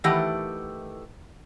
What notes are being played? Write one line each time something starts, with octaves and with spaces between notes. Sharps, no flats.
D#3 E3 A3 G4 F#5